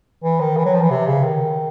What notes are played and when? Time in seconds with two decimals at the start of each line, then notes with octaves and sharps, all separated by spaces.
0.23 E3
0.40 D#3
0.57 E3
0.65 F#3
0.73 F3
0.82 E3
0.90 C3
1.07 C#3
1.24 D#3